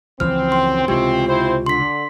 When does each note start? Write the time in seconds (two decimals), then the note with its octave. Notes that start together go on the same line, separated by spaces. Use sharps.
0.20 C#2 F#2 E3 F3 C4 F6
0.52 G5 C6
0.88 C#2 A2 C3 E3 G#3 C4 F4 G4
1.29 C4 E4 C5
1.66 D3 C6 B6